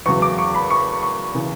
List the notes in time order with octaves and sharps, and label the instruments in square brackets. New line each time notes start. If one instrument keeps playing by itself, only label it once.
[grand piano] E2 C#3 F#3 C#6
D6
C#6
B5
C#6
C#6
C#3 E3